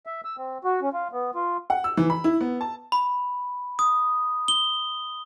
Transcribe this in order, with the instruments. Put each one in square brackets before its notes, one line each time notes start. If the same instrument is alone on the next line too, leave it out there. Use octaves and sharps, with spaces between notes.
[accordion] E5
E6
C4
F#4
C#4
F4
B3
F4
[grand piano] F#5
E6
E3
B5
E4
B3
A5
[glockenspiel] B5
D#6
G7